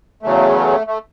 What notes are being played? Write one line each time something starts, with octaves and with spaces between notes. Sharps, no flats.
E2 C#3 F#3 A3
A3